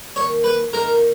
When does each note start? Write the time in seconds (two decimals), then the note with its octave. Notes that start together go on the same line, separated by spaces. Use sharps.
0.16 D#2 D#3 A#3 D#4 C#5
0.44 B4
0.72 D#2 D#3 A#3 D#4 A#4